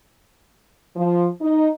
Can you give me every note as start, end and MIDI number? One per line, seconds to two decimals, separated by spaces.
0.96 1.28 53
1.41 1.70 63